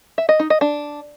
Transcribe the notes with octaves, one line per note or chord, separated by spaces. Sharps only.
E5
D#5
D#4
D#5
D4